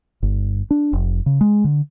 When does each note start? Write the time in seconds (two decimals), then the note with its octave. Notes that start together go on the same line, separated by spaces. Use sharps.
0.23 G1
0.71 D4
0.93 F1
1.26 C#3
1.41 G#3
1.64 D3